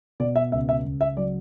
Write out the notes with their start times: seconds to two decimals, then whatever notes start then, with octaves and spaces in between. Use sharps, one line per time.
0.20 B2 D5
0.36 E5
0.52 C#2 E5
0.69 E5
0.85 C#2
1.01 E5
1.17 F#3 D5